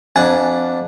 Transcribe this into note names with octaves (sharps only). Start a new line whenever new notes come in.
F2 D4 F#5 G#5